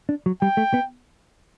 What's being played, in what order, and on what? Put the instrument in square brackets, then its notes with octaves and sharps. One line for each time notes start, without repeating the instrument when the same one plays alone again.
[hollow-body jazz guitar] D4
F#3
[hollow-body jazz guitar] G3 [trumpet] G5
[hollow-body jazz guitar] A3
B3